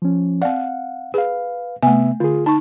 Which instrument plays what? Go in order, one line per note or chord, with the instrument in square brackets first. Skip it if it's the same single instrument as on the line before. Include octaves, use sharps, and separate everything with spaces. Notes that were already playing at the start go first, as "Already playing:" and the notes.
[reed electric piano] F3 C#4
[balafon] C4 D5 [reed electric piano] F5 F#5
[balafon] G#4 [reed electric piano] B4 F5
[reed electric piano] C3 B3 E5 [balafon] A3 G#5
[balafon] D3 [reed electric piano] F4 G#4
[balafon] D#4 C#6 [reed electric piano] A5